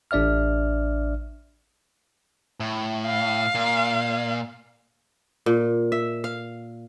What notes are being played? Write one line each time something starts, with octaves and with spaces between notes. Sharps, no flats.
A1 D4 D5 E5 F6
A2
F5
A#2
A#2
E5
F5